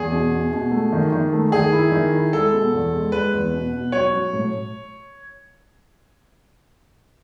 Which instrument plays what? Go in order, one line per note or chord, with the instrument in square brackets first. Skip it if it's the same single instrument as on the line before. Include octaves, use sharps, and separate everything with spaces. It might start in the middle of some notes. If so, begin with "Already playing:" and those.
Already playing: [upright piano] E2 [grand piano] G#4
[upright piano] B2
B2
B2
A3
D#3
D#3
A3
[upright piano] D#3 [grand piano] G#4
[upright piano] E4
D#3
E4
[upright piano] G#3 [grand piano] A4
[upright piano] B2
E2
G#3
[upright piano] G#3 [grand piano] B4
[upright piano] E2
B2
B2
[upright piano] F#3 [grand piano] C#5
[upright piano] F#3
A2